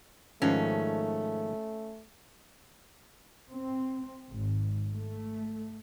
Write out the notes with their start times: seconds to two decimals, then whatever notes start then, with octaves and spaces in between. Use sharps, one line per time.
0.42 G#2 D#3 F3 A3 C#4
3.50 C4
4.32 G#1
4.94 A3